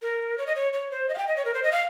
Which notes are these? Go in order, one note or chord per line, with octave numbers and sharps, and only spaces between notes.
A#4
C#5
D#5
C#5
C#5
C5
D#5
F5
G5
D#5
C#5
A#4
C5
D#5
F5